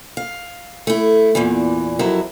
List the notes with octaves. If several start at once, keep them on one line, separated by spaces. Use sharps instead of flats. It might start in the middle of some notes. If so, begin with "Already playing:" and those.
F5
A3 E4
E2 A#2 E3
F2 F#3 E4 A#4